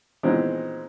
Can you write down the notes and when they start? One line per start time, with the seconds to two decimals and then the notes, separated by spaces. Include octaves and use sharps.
0.23 A#2 D#3 E3 G#3 B3 C4